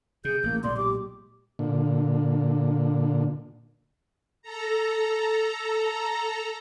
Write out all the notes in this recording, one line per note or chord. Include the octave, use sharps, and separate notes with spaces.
C3 G#4 G6
A1 A#3
B1 A#2 G#3 D5 C6
G4 D6
A#2 D3
A4 A#5